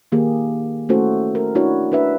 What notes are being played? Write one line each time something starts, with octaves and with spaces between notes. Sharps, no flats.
D#3 A#3 G4 G#4
A3 C#4 E4 F#4 A4 C5
A#4
D4 E4 F#4 C#5
D4 B4 E5